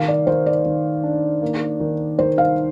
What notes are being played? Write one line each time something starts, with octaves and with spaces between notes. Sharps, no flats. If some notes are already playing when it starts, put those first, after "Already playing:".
Already playing: D#3 F5
D5
D#3 C5
D5
D#3
D4
A#3
D#3
D#3 C5
F5